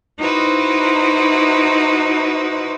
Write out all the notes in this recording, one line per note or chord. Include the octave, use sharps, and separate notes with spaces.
D#4 E4 F#4 B4 C5